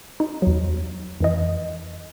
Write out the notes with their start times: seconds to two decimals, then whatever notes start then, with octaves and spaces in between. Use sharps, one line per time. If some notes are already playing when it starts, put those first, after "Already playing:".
0.20 D#4
0.42 E2 F#3
1.20 F2 E3 D#5